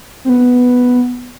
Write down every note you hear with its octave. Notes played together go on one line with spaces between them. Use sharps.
C4
B3